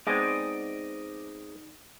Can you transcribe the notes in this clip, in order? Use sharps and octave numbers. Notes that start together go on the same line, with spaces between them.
G#3 B3 C4 D#4 D5 D#5